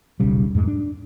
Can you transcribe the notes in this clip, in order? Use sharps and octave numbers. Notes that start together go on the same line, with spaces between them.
D#1 B1 C#3 G3
F2 G#2 G#3
D4